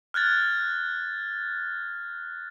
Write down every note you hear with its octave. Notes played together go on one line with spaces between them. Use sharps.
F6 F#6 G#6 A6